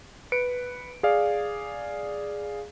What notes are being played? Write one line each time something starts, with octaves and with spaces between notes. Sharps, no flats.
B4 C#7 D7
G#4 D5 F5